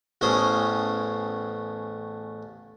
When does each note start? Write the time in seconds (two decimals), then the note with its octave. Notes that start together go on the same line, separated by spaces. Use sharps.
0.21 A1 E2 A2 C#4 C5 D#6